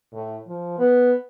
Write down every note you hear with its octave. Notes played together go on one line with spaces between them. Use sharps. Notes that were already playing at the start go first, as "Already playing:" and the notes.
A2
F3
B3